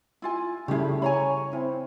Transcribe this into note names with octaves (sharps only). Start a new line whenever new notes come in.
E4 F4 G#5
C#3 G3 A3 E4 G4 G#4
C#5 G#5 A#5 B5
C4 E4